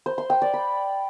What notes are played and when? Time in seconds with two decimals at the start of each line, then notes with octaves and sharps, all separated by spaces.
0.06 C5
0.18 C6
0.30 G5
0.42 D5
0.54 B5